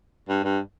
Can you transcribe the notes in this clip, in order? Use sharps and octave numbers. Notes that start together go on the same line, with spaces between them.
G2
G2